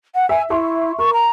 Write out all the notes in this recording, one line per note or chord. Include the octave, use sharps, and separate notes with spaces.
F#5
E5 G#5
E4 E5 C6 C#6
A#4 C#6
A#5